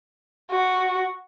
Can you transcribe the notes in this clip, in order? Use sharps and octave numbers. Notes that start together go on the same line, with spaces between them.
F#4